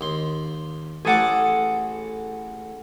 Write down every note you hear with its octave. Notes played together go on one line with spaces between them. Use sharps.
D#2 C6
A1 G#4 A4 F#5 A5 D6